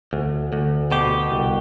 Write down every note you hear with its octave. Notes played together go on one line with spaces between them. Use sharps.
D2
D2
B2 G4
C2